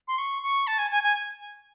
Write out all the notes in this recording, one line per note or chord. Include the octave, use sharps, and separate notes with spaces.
C6
C#6
C#6
A5
G#5
G#5
G#5